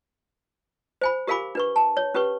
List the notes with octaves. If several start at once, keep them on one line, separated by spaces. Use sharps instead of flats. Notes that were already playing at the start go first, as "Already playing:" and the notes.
C5 G#5 B5
G4 A#4 F5 G#5 B5 D6
D4 B4 C#6
A5
C#5
C#4 G4 B4 C#6